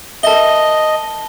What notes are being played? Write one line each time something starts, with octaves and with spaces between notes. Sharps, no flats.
A#4 D#5 E5 A5 A#6 G7